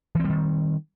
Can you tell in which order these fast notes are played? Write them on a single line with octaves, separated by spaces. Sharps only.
E3 C4 G3 D#3